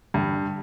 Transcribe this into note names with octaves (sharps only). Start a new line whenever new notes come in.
G2 D3